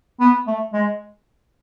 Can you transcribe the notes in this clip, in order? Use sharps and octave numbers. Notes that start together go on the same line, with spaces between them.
B3
A3
G#3